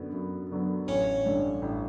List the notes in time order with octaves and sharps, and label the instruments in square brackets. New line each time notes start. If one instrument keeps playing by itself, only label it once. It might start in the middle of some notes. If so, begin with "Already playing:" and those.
Already playing: [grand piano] F#2 D3 F#3 B3
F#2
D3 F#3 B3
[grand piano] A1 [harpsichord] C#4 C#5
[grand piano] G2 D3
A1